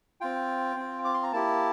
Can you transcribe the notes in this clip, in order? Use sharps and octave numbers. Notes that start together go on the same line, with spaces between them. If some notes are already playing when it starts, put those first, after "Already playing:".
C4 F4 G5
C4 F4
D6
C6
A#5
A#3 E4 G4 A5